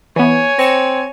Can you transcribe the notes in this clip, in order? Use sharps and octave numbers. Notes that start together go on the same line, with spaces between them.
E3 B3 C#5 G#5
C4 A#6 C#7 E7